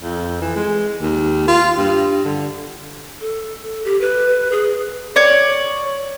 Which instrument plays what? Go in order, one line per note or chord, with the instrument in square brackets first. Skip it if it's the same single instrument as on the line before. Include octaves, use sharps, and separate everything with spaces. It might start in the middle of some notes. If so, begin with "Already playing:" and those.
[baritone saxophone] F2
E3
G#3
D#2
F4
G2
D3
[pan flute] A4
G4
B4
G#4
[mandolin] C#5 D5